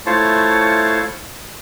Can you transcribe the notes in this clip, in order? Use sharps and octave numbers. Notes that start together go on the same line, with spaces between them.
A3 E4 F4 C5 C#5 A5